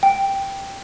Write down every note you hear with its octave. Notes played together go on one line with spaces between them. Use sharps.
G5